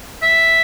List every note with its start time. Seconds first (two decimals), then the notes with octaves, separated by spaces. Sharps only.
0.22 E5